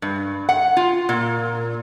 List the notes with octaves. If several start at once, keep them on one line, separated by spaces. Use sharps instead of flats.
G2
F#5
F4
A#2